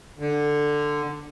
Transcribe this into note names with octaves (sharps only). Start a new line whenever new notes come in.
D3